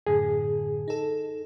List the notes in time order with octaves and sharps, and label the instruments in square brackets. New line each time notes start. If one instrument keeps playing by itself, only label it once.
[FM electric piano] F#2 A2 D3 [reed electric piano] G#4
[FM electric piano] D#4 A4